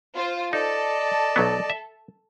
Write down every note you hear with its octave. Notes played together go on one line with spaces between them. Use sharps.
F4 C5
D#4 A4 D5 D#5 A5
B1 F#3 B3
E5